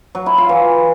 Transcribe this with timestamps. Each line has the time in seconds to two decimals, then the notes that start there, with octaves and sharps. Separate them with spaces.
0.15 F#3
0.26 E4
0.38 F4
0.49 E3